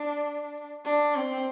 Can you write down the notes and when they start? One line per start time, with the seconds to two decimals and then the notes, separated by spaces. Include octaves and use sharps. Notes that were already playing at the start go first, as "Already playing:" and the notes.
Already playing: D4
0.85 D4
1.15 C4